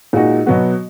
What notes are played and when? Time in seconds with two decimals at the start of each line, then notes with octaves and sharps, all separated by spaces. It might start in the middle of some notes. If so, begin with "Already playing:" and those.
0.13 A#2 G#3 D#4 F#4
0.46 B2 F#3 B3 F#4